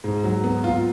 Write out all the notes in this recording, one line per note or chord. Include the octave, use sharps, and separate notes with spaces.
G#2
F#3
B3
F4